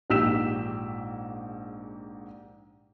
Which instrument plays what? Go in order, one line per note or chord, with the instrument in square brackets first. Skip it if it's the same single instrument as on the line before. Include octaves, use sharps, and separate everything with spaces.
[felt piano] A#1 G#2 G4 E6 B6 E7